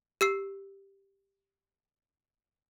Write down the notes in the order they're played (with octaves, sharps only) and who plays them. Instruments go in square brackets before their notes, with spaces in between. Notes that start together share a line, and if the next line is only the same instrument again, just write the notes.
[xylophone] G4 E6 C7